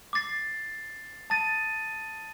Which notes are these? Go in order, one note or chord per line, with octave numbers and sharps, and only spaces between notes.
D6 A6 C7
A5 D#6 A6 D#7